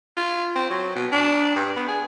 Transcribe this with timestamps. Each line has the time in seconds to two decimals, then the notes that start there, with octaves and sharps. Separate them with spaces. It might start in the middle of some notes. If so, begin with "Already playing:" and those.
0.17 F4
0.56 C4
0.70 F#3
0.96 B2
1.12 D4
1.56 G2
1.76 B3
1.88 G#4